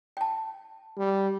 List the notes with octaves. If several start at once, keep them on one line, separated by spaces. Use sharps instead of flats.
G5 A5
G3